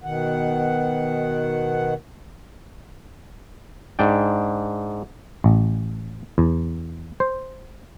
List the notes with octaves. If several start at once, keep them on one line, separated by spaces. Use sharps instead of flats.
B2 D#3 F#5
G#2 D4 D5 G5
A1
E2
C5